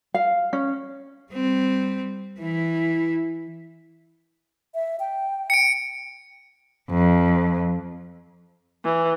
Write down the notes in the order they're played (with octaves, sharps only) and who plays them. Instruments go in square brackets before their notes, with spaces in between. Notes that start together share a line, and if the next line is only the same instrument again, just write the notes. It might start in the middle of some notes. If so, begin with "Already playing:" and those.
[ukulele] F5
C#4
[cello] G3 C4
E3 E4
[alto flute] E5
G5
[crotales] C#7 D7
[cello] F2
[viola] E3